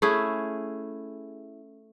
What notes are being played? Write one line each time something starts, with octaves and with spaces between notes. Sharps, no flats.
A3 C#4 E4 G#4